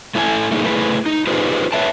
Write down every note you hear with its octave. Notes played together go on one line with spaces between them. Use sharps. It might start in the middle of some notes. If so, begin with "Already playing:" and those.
A3 E4 A4 G5 G#5
A3 A#3 D#4 G#4
A3 E4 G#4 B4
D#4
D#4 F4 G4 G#4 B4 C5
B4 C#5 E5 G5 A5